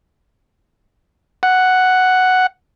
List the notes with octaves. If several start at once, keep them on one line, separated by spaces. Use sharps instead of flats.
F#5